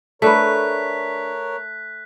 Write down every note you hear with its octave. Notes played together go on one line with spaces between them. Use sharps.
A3 D4 A#4 B4 C#5 F#6 B6